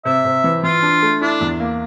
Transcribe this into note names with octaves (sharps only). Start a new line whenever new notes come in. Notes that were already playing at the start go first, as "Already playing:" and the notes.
C3 E5
C3
E3
E3 F4
D4
A3
D4 E4
E2
A#3